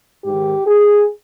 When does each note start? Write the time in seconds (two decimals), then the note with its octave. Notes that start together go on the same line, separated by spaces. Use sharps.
0.24 G#2 D#3 G4
0.67 G#4